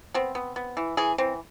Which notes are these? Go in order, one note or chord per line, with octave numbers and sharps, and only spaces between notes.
B3 C4
B3
B3
E3
E3 G#4
E3 C4